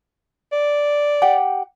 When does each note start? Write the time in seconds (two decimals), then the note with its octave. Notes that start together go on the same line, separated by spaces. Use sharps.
0.52 D5
1.22 G4 F#5 G5